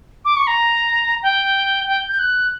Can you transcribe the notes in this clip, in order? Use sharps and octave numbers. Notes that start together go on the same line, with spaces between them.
D6
C#6
A#5
G5
G5
G6
F#6